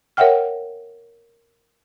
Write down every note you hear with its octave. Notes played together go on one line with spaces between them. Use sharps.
A#4 C#5 E5 F#5 G5 F6